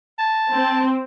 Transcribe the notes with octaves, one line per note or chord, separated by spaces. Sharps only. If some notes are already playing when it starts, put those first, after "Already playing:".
A5
C4